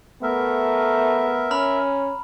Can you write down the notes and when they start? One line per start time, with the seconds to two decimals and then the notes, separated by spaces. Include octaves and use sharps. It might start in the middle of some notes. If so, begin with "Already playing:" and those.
0.23 A3 B3 A#4 E5
1.51 C#4 A#5 B5 F6